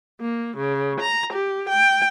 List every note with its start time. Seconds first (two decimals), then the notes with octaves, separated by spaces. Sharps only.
0.21 A#3
0.58 C#3
1.01 A#5
1.33 G4
1.69 G5